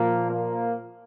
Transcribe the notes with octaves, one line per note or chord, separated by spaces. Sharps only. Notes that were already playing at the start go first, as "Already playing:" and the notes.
Already playing: A#2 F3 A#3
A#3